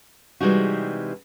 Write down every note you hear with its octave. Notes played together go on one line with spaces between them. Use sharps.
C3 E3 G3 G#3 D#4 F#4